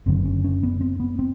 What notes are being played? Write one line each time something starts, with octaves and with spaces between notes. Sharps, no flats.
F#1 F#2 D3 C4
C#4
C#4
B3
C4
B3
C4